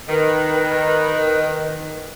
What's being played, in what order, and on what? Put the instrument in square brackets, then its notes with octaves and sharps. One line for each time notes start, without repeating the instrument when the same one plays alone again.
[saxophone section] D#3 [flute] B4